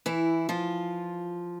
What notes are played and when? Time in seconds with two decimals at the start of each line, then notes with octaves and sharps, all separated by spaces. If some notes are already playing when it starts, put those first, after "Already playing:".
0.06 E3 E4
0.49 F3 F4